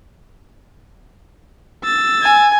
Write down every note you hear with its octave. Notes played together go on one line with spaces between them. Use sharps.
E6 A6
G#5